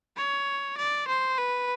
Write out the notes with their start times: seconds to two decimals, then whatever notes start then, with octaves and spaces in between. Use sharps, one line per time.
0.17 C#5
0.78 D5
1.08 C5
1.38 B4